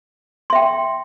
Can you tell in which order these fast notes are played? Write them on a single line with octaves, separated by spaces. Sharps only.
C6 E5 G5